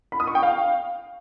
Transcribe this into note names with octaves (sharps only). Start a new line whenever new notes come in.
B5
D#6
C#6
G5
F5